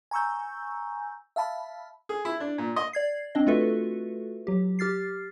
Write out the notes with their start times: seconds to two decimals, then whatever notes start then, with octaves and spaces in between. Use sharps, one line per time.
0.11 G#5 A#5 C#6 E6 G6
1.36 E5 F5 A5 B5
2.09 G#4
2.25 E4
2.40 D4
2.58 A#2
2.76 D#5
2.93 D5 G#6 C7
3.35 C4 D4 D#5
3.47 A3 F4 F#4 A4 B4 E5
4.47 F#3 G4
4.79 G4 F6 A6 C7